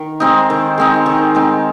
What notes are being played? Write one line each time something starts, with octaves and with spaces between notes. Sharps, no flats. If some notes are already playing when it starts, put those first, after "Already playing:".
Already playing: D#3
G#3 C4 D#4
D#3
G#3 C4 D#4
D#3
G#3 C4 D#4